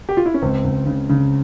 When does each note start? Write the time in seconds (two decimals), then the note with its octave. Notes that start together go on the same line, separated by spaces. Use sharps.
0.09 G4
0.17 F4
0.26 E4
0.34 C#4
0.42 C#2 C4
0.64 C#2
0.86 C#3
1.10 C#3